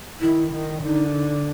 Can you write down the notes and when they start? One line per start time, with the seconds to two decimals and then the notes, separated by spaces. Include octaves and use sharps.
0.21 D#3 E4
0.52 D#3
0.84 D3 D#4